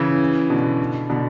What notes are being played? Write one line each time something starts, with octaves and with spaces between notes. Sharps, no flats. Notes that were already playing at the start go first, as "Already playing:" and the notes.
Already playing: C#3 E3
B2 D3
B2 D3